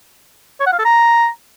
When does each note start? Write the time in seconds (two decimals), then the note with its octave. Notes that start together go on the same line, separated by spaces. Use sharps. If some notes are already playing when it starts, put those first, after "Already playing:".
0.60 C#5
0.66 F#5
0.73 F5
0.79 A4
0.85 A#5